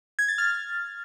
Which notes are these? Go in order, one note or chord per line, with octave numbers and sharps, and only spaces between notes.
G#6
A6
F6